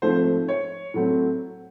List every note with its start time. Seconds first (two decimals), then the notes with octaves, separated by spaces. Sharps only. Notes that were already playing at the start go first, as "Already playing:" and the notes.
0.02 G#2 F3 A3 C4 C5
0.48 C#5
0.94 A2 F#3 A3 C4